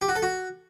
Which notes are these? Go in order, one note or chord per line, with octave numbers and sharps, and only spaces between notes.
G4
F#4
A4
F#4